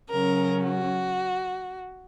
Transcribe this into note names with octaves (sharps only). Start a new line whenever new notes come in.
C#3 F#3 C#4 A#4
F#4